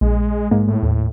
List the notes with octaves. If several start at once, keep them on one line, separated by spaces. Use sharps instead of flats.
A#1 G#3
G#2 G#3 A#3
A2
D#2